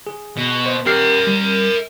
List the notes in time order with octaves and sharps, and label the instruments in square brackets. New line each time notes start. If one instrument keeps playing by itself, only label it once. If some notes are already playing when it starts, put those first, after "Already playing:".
[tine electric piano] G#4
[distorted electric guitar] B2
[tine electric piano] C5 D#5
[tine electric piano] G4 F6 C7 [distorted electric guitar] A#4 E5
[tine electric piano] G3